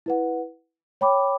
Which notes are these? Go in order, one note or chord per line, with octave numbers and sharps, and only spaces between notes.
E4 B4 F#5
C#5 G5 B5 D6